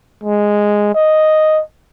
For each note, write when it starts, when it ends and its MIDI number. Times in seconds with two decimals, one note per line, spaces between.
0.24 0.92 56
0.95 1.62 75